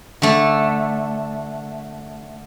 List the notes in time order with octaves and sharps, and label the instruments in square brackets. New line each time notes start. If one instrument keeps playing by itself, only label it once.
[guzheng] D3 A3